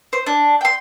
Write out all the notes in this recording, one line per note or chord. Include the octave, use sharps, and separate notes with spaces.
C5
D4
G5 C6